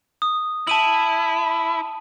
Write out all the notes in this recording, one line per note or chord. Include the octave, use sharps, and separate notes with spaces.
D#6
E4 A5 D#7 F#7